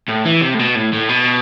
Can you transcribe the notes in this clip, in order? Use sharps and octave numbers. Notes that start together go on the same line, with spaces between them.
A2
E3
C3
A2
B2
A2
A2
B2